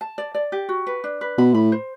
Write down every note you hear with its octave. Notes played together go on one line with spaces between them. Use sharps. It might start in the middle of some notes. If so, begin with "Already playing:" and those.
A5
D5
D5
G4
F#4
B4
D4
B4
B2 B5
A2 B5
C5